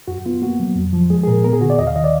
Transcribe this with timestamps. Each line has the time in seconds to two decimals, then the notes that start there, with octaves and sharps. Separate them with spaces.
0.08 F#2 F#4
0.26 B3 F4
0.42 A#3 F#4
0.60 F#3
0.76 F2
0.93 F3
1.10 G#3 G#4
1.23 G#4
1.27 A#2 A#4
1.44 B3 A#4
1.53 G#4
1.61 D3 F#4
1.70 D5
1.79 D#2 D#5
1.87 F5
1.96 D#3 D#5
2.04 D5